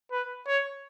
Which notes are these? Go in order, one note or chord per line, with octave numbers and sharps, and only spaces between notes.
B4
C#5